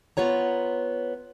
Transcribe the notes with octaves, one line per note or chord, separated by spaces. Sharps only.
B3 F4 C#5 A#5